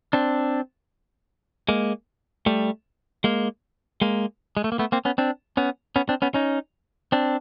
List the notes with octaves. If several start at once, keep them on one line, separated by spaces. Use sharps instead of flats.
C4 D4
G#3 A#3
G3 A3
G#3 A#3
G#3 A#3
G#3
A3
A#3
A3 B3
A#3 C4
B3 C#4
C4 D4
B3 C#4
B3 C#4
C4 D4
B3 C#4
C#4 D#4
C4 D4